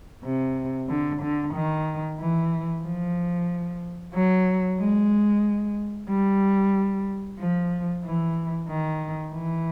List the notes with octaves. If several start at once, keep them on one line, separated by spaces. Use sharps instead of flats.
C3
D3
D3
D#3
E3
F3
F#3
G#3
G3
F3
E3
D#3
E3